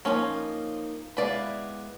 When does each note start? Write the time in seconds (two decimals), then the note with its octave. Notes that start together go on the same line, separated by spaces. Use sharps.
0.05 F3 A#3 C#4 D#4 C#5
1.17 G#3 B3 E4 B4 D5 F5